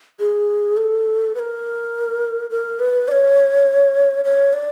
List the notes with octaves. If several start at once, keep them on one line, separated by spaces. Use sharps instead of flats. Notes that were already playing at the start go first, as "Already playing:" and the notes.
G#4
A4
B4
A#4
A#4
B4
D5
C#5
C#5
D5